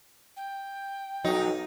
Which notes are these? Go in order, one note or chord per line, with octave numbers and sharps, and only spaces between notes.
G5
B1 F#3 D#4